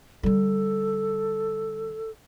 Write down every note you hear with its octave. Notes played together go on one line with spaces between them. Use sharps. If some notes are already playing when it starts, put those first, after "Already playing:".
D3 G3 A4